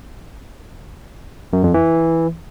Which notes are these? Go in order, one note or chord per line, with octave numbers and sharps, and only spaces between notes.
F#2
F2
E3